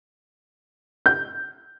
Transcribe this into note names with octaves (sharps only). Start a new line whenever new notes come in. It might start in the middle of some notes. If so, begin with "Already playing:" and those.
G6